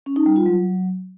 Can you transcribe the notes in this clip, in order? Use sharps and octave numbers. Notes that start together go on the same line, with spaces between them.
C#4
D#4
G3
F4
F#3